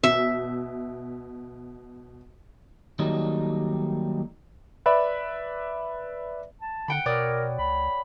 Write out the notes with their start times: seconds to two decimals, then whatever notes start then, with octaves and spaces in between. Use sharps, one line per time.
0.03 B2 E5
2.99 D#2 D#3 F#3 G3 A3 D#4
4.86 B4 D5 E5 B5
6.62 A5
6.88 D3 F#5 G5 B5
7.06 B2 A#4 C#5 D5 D#6
7.59 C#2 B5